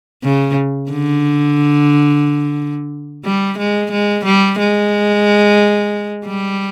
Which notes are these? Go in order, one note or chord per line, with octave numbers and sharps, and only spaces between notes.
C#3
D3
G3
G#3
G#3
G3
G#3
G3